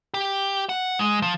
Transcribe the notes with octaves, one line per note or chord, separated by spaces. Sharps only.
G4
F#5
G#3
F3